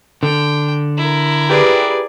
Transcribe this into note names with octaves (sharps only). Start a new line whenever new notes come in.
D3 G5
E4 A#4
G4 G#4 B4 D5